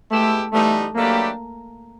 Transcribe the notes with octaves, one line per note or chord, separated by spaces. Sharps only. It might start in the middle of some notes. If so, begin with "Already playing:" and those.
G#3 A3 B3 E4 G4
E3 G3 A3 B3 D#4
F#3 A3 A#3 D4 G4 B4